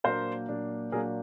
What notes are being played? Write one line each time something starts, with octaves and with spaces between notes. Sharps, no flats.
A#2 F#3 A#3 D4 A#4 C5
A#2 F#3 A#3 D4
A#2 F#3 A#3 D4 G#4 A#4